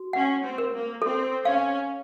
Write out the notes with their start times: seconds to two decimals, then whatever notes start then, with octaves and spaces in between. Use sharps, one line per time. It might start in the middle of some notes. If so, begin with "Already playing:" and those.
Already playing: F#4
0.13 C#4 F#5
0.43 C4
0.58 A#4
0.73 A#3
1.02 C4 A4
1.45 C#4 F5